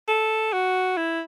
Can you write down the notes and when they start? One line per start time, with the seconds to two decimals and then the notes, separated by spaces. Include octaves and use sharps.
0.08 A4
0.53 F#4
0.97 E4